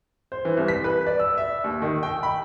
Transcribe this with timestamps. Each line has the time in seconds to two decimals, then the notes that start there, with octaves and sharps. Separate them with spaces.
0.32 C5
0.45 E3
0.57 C2
0.68 B6
0.84 B4
1.06 D5
1.19 E6
1.37 E5
1.64 D#2
1.82 D#3
2.03 G5
2.23 B5